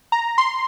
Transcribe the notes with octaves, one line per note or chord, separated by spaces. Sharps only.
A#5
C6